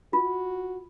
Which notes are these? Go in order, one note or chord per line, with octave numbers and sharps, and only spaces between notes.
F4 F#4